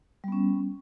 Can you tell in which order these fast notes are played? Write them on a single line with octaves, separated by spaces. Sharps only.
G3 B3 C#4